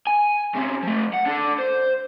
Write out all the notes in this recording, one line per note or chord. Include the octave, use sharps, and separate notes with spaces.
G#5
C#3 C4
F3 A3
F#5
D4 A4
C5